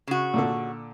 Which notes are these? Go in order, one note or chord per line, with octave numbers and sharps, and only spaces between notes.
C#3 F#4
A#2 D3 A4